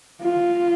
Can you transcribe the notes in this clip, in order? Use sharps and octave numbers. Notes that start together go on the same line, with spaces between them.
F4